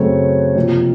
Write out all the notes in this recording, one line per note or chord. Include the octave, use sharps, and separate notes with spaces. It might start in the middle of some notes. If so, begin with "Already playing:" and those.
Already playing: F#2 C#3 A3 C4 C#5
F2 C3 F3 A#3